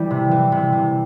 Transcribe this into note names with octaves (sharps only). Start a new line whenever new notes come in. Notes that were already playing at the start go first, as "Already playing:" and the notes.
Already playing: E3 G3
C3
E3
C3
C3